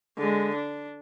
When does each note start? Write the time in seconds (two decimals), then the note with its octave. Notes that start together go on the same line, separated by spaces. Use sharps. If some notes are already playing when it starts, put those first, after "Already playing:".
0.18 D3 G#3
0.55 D4